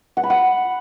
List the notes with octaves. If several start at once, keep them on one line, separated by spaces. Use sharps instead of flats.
F#5
B5
F#5